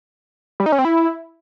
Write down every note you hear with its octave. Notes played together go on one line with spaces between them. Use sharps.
G3
D#4
C#4
C4
E4